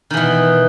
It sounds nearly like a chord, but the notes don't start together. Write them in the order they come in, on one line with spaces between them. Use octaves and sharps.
D#3 E3 B2